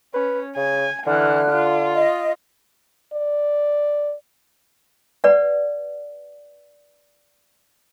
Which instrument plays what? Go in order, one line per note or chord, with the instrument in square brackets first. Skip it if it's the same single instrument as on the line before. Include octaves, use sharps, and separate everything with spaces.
[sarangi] C#4 [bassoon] B4
[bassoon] C#3 [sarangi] G#5
[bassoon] D3 [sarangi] E3 [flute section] F6 F#6
[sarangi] F4
[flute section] D#5
[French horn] D5
[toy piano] B4 D5 F#5